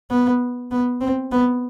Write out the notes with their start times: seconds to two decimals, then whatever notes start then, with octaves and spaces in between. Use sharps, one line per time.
0.10 B3
0.71 B3
1.01 C4
1.32 B3